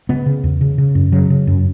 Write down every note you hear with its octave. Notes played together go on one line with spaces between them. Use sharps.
C#3 B3
C#3
E2
C#3
C#3
F#2
C#3 F#3
C#3
F#2